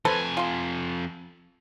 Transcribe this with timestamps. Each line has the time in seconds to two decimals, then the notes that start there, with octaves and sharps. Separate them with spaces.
0.05 F2 A4 B4 C5 G#5
0.37 F4 C6